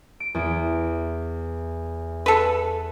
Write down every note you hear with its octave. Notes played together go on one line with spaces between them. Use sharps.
D7
E2
A4 B4